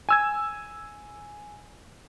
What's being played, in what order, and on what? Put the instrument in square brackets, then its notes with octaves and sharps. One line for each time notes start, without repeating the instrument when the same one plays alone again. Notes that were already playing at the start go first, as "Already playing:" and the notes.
[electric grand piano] G#5 E6 G#6